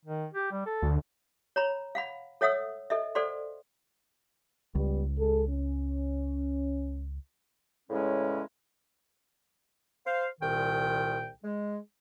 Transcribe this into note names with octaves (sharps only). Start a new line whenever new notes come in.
D#3
G4
G3
A4
D2
C#5 A#5 B5
F5 F#5 B5
A4 C#5 E5 F#5 D#6 E6
A4 D#5 E5
A4 C5 D5 F#5 C6
C#2 G3 B3
G#3 A4
C#4
E2 A2 C#3 G#3 C#4
C5 F5
C2 A#2 D#3 G5
G#3